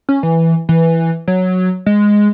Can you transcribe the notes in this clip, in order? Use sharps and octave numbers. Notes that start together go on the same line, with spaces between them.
C#4
E3
E3
F#3
G#3